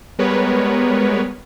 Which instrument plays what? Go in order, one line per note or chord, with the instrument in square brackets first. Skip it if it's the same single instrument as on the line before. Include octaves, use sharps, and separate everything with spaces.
[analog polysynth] G3 G#3 B3 A#4 B4 C#5